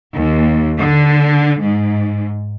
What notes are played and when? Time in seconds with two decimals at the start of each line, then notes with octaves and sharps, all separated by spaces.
0.14 D#2
0.79 D3
1.62 G#2